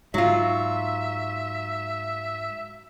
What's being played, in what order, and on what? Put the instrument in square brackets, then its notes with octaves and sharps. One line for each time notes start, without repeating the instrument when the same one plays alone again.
[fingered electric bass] G#2 [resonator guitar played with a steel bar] F#3 F4 [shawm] E5